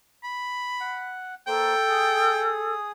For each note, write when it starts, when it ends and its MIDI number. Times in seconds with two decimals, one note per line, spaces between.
0.24 1.17 83
0.80 1.35 78
1.47 1.74 58
1.47 2.74 69
1.47 1.74 72
1.47 2.56 79
1.89 2.92 68
1.89 2.92 87